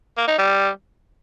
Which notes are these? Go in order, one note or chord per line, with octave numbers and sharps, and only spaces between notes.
A#3
D#4
G3